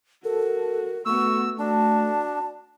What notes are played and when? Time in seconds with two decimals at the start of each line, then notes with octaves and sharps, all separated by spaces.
0.24 F#4 A4 A#4
1.06 A3 B3 F#4 C#6 E6
1.59 D4 F#4 A5